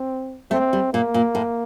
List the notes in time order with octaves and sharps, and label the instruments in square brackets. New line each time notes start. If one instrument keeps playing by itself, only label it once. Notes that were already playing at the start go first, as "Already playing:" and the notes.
Already playing: [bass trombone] C4
[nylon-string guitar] A3 [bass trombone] C4
[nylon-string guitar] G3
[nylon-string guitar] A#2 [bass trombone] A#3
[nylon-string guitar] A#2
A2